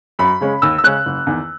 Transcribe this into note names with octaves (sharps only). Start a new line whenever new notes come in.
F#2 B5
C#3 G#3 C#4
D#2 E6
E6
C#3 G#3 C#4 F#6
F#1
E2 D#3